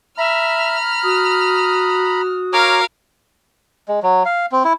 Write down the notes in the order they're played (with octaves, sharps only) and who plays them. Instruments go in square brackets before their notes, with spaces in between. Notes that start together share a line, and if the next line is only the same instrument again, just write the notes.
[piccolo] E5 [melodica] A#5 B5 [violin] F6
[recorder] F#4 [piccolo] D#6
[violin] A#4 F5 [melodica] C#5 A#5 D6
[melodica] G#3
F#3
F5
C4
E4